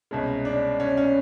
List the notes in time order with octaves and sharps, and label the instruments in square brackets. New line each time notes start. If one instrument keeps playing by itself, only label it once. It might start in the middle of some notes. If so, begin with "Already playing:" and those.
[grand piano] C2 B2 G#3 C#4
D4
C#4
C#4